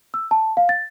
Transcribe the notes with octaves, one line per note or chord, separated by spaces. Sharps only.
E6
A5
F5
A6